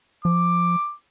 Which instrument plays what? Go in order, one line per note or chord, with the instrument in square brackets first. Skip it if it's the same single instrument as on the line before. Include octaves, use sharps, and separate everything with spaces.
[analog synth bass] F3 [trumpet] D6